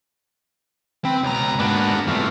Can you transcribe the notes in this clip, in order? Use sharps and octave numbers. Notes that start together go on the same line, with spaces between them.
C4 B4
C#2 B2 A#5
G#2 A#3 B3 D4 F#4
G2 C3 E3 A3 F4